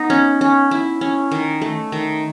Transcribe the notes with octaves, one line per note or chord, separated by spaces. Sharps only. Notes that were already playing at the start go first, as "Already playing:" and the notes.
Already playing: B3 D#4
C#4
C#4
E4
C#4
D#3
A3
D#3